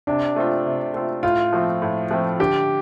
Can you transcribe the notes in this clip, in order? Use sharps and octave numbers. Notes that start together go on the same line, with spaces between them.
C3 D4
A3 C4 F4
C3
A3 C4 F4
A2 F4
F3 A3 C4
A2
F3 A3 C4
D3 G4